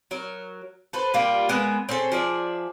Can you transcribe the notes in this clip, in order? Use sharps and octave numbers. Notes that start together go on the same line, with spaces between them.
F#3 A#4
A4 B4 C5
G3 A#3 D4 F4
G#3 B3 A#4 E5
C4 C#4 G#4 A4
F3 G#4 D5 E5